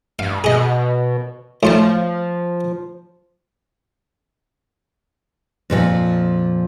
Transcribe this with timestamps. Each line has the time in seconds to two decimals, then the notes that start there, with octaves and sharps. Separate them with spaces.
0.19 G2 F5
0.44 B2 G#4 D#5
1.63 A2 F3 F4 A5
5.70 F2 A#2 E3 F3